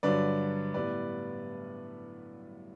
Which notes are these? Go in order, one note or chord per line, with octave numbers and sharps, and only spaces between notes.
G2 D3 F#3 B4 D5
A2 G3 B3 B4 D5